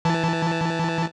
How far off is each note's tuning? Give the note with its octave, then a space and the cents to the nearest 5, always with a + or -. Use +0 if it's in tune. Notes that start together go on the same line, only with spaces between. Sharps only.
E3 +0 A5 +0